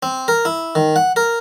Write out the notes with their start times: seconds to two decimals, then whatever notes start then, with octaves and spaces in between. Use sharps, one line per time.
0.03 C4
0.28 A#4
0.45 E4
0.75 D#3
0.96 F#5
1.16 A#4